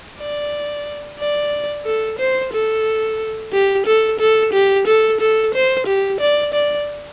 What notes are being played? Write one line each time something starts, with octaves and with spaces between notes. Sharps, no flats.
D5
D5
A4
C5
A4
G4
A4
A4
G4
A4
A4
C5
G4
D5
D5